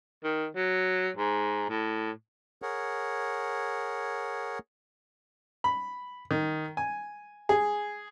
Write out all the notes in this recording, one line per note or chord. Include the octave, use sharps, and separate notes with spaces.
D#3
F#3
G#2
A2
G#4 A#4 C#5 F#5
B5
D#3
G#5
G#4